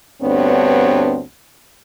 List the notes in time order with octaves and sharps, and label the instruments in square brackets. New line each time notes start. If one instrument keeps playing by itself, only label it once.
[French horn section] D2 G2 B3 C4 D4 C#5